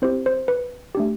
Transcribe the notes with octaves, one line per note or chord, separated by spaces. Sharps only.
C4 E4 G4 C5
C5
B4
A3 D4 G4